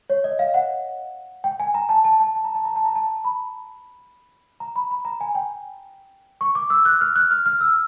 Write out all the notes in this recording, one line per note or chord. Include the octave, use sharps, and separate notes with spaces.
C#5
D#5
F5
F#5
G5
G#5
A#5
A5
A5
A5
A5
A#5
A5
A#5
A5
A#5
A5
B5
A#5
B5
B5
A#5
G#5
G5
C#6
D6
E6
F#6
F6
F#6
F6
F6
E6